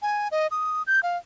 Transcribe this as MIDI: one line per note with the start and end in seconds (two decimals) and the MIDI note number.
0.02 0.28 80
0.32 0.47 75
0.51 0.83 87
0.87 1.00 91
1.03 1.17 77